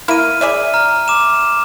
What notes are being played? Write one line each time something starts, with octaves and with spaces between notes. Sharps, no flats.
A#3 E4 A#4 F6 D#7
G#4 D5 E5
A#5 F6
D6 E7